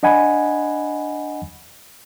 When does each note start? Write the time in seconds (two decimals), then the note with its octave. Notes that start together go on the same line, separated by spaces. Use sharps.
0.03 D4 D#5 F#5 G#5 B5